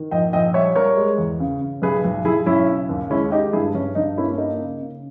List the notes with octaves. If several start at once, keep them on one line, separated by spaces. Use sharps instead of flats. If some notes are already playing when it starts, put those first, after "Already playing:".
Already playing: D#3
A#1 D#5 G5
A#1 D#5 G5
G3 C#5 E5
G3 A#4 C#5
G#3
E2
C#3
C#3
B1 G#4 B4
B1
B1 E4 G#4
B1 C#4 E4
C#3
D#2
G#3 C#4 E4
G#3 D#4 G4
G2 E4 G#4
G2 C#4
G2 D#4
A#3 C#4 E4
C#4
A#3 D#4
C#3
C#3